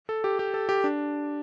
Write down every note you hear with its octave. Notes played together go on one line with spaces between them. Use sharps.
A4
G4
G4
A4
G4
D4